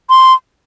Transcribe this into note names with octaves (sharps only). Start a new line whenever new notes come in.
C6